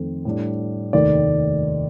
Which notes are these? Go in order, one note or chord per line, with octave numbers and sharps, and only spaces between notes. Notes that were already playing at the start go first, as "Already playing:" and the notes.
Already playing: F2 D#3 A3 C4
A2 G3 D4
F1 D#2 D#3 A3 D5